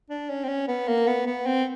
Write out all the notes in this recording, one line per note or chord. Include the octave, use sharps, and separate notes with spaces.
D4
C#4
C4
C#4
B3
A#3
B3
B3
C4